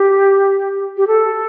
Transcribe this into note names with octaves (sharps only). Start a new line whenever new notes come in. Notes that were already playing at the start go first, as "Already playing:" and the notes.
Already playing: G4
G4
A4